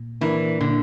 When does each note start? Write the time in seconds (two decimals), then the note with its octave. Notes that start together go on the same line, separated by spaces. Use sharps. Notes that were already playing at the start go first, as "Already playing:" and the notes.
Already playing: A#2
0.21 E3 A#3 D4 A#4 D5
0.61 A#2 D3